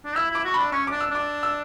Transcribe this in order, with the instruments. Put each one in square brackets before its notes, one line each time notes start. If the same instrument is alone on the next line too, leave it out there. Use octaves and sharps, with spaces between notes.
[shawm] D4
[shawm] E4 [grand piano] E6
[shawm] E4 [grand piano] D6
[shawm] F#4 [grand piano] C#6
[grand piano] B5
[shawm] D4
[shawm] C#4 [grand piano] C#6
[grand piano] D6
[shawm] D4
[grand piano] E6
[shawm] D4 [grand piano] D6
[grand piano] E6